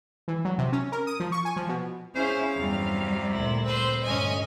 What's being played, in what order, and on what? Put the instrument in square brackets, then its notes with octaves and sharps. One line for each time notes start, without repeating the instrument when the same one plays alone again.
[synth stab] E3
F#3
C3
C#4
A#4
D#6
F3
C#6
G#5
F3
B2
[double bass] C#4 [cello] E4 G#4 [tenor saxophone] C5 [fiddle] F5
[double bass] E2 G2 [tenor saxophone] C3 [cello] F#3 G3
[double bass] D2 A#2 [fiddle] E4
[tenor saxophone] C4 [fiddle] B4 C5
[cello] D2 D#5 [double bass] G2 [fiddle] C#4 G#5